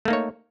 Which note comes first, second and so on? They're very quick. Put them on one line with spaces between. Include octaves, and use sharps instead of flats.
A3 A#3 D#4 C#5